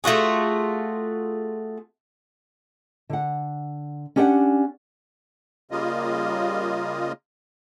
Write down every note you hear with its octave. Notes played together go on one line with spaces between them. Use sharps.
A3 F4 F#4 G#4
D3 F#5
C#4 D4 G4 D5 E5 F#5
C#3 G3 A#3 F4 D#5